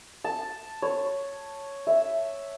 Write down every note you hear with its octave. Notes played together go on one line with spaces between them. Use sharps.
A5
C#5
E5